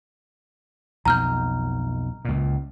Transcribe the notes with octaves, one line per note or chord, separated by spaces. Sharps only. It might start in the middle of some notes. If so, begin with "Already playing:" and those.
B1 F2 A#5 F6 G6
C#2 A#2